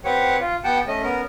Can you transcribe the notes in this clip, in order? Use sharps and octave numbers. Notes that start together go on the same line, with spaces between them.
C4 G4 B4 C#5 F#5
F4
B3 G4 F#5 G5 A5
A3 C#4 D#5
B3 C#4 A#4